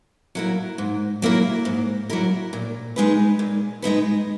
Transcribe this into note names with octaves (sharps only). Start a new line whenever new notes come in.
F#3 A#3 E4 A#4
G#2
F#3 A#3 E4 A#4
G#2
F#3 A#3 E4 A#4
A#2
G#3 D#4 G#4 B4
A#2
G#3 D#4 G#4 B4